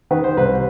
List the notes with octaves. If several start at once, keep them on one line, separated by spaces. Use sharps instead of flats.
D#3 B4
C5
C2 B4